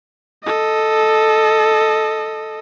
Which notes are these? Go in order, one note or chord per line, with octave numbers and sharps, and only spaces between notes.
A4 D#5